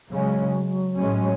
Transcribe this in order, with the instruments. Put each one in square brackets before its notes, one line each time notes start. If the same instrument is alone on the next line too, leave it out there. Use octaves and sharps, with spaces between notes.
[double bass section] C#3 G#3 C#4 [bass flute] F#3
[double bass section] A2 G#3 C#4